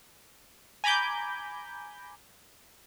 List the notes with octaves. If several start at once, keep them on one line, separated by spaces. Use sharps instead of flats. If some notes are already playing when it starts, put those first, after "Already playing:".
G#5 A#5 B5 D6 G6